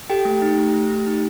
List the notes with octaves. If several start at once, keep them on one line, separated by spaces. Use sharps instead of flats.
G4 A4 G5
A3
D#4
A3
A3
A3
D#4